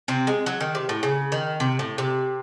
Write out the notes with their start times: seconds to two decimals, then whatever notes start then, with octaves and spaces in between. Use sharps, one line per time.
0.08 C3 C4
0.27 G#3
0.46 F#3
0.61 D#3
0.75 C3
0.89 A2
1.03 C#3
1.32 D#3
1.60 C3
1.79 A2
1.98 C3